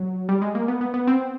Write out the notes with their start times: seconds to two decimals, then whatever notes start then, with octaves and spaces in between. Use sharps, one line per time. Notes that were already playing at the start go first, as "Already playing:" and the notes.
Already playing: F#3
0.29 G3
0.42 G#3
0.55 A#3
0.68 B3
0.81 B3
0.94 B3
1.07 C4